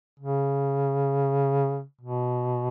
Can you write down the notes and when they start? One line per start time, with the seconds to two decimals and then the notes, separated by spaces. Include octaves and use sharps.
0.20 C#3
2.01 B2